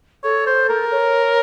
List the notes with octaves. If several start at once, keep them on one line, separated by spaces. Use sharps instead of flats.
A4 C#5
C5
A#4
C#5